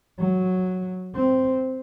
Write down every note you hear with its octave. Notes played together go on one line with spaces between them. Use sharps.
F#3
C4